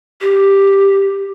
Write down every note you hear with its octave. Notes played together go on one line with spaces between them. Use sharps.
G4